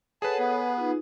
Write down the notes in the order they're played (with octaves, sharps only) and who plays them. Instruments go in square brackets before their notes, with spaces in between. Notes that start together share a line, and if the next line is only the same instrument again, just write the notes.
[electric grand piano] G#4 B4 [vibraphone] A4 C#5 F#5 [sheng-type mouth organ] A5
[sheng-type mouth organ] B3
[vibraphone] D#4 F4